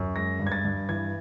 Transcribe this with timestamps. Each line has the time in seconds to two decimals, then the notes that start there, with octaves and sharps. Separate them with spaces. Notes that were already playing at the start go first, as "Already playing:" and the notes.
Already playing: F#2
0.15 G#3 A#6
0.39 G2
0.47 G#6
0.52 A6
0.65 G2
0.89 E3 G#6